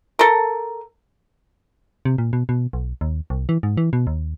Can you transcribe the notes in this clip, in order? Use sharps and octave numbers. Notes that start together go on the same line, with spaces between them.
A4 A#4
C3
A#2
B2
B2
B1
D#2
C2
E3
G#2
E3
B2
D#2